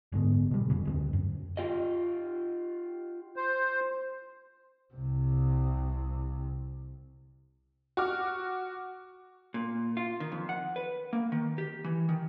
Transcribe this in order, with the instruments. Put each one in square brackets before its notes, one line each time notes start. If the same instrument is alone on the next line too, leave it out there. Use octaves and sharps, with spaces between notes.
[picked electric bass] F#1 G#2 D3 B3
B2 G3
E1 F2 C#3
D2 G#3 C4
F#2
[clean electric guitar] F4 G4 D#5
[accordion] C5
[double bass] C2 C3
[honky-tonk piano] F#4 C#6 D6 F6
[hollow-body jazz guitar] A#2
F4
D#3
F2
F#5
B4
A#3
D#3
G4
E3
D#3